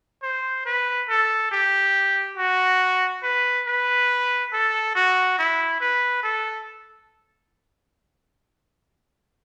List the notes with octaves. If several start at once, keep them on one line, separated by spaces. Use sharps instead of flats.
C5
B4
A4
G4
F#4
B4
B4
A4
F#4
E4
B4
A4